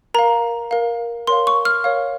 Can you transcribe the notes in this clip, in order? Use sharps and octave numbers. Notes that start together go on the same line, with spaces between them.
A#4 F5 A#5
A#4 F5
A#4 C#5 F5 C6
C#6
F6
A#4 C#5 F5